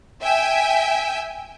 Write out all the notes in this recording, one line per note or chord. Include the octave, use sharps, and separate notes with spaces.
E5 G5 G#5